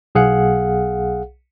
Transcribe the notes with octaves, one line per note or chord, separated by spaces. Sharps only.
B1 G#4 F5 F#5